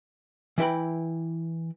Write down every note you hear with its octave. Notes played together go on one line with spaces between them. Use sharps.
E3 E4 B4 G5 B5